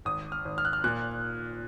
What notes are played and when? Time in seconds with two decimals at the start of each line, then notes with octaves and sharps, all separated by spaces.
0.05 G#1 D#6
0.32 F6
0.45 G#1
0.58 F6
0.65 F#6
0.73 F6
0.84 A#2 F#6